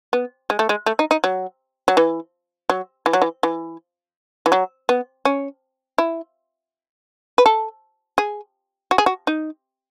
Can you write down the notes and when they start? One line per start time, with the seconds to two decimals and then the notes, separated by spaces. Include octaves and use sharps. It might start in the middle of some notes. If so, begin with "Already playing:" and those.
0.13 B3
0.50 G#3
0.59 A3
0.69 G#3
0.86 A3
0.99 D#4
1.11 D#4
1.24 F#3
1.88 F#3
1.97 E3
2.70 F#3
3.06 E3
3.13 F#3
3.22 E3
3.43 E3
4.46 E3
4.52 F#3
4.89 B3
5.25 C#4
5.98 E4
7.38 B4
7.46 A4
8.18 G#4
8.91 F#4
8.98 G#4
9.06 F#4
9.27 D#4